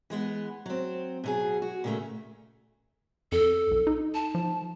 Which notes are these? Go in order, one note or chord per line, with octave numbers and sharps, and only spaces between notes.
E3 G#3 B3
F#3 C4
B2 F#3 G#4
F#4
A#2 C#3 A3
F2 A4
B1
D#4
A5
F3